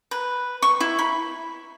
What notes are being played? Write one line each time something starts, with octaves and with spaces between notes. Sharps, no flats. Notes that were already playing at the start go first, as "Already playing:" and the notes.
B4
C#6
E4
B5